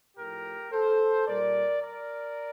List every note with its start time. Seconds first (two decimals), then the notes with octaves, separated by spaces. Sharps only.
0.17 A2 F3 G4 A#4
0.72 A4 C5
1.27 A#2 G3 A#4 D5
1.82 A#4 D5